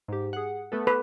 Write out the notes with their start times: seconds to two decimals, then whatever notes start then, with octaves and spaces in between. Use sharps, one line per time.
0.08 G#2 G4
0.33 G#4 F#5
0.72 A3 B3 A4
0.87 B4